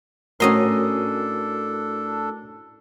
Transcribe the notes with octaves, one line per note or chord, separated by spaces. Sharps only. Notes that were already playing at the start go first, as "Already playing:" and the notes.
A2 C#4 D4 F#4 A4 A#4 D#5 C6